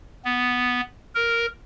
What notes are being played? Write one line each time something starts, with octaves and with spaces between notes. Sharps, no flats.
B3
A#4